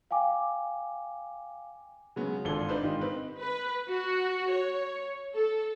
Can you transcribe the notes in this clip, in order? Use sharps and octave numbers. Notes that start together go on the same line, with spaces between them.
F5 G5 G#5 D6
C#3 F#3 G#3 B3
G#1 D4 F4 A4 G7
D4 D#4 B4 C5
G#2 D#3 D#4 F4 G4
C4 D#4 B4
B4
F#4
C#5
A4